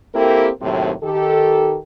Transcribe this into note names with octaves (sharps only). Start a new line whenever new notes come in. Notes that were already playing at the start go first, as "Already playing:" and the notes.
A#3 C4 E4 G4 A4 A#4
D#2 A2 C3 F#3 C4
D#3 G4 A4